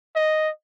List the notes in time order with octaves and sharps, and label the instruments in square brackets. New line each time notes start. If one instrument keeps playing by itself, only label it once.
[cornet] D#5